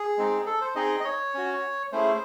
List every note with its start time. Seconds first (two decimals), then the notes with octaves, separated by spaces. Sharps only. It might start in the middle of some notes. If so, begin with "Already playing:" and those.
Already playing: G#4
0.18 G#3 C4 D#4
0.46 A4
0.61 C5
0.76 C4 D#4 G#4 D#5
1.00 D#5
1.04 C#5
1.34 C#4 F#4
1.92 A3 C#4 E4 G#4 C5